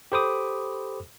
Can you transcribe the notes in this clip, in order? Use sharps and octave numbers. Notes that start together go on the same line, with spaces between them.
G4 A4 C5 B5 D6 D#6